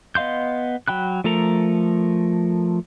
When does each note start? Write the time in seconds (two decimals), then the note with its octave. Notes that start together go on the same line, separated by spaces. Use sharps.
0.15 B3 D#5 F5 C6 G6
0.88 F#3 G5 B5 F#6
1.24 F3 A3 A4 A#4 A#5